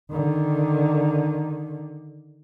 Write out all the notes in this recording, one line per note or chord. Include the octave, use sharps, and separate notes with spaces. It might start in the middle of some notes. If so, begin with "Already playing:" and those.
D3 D#3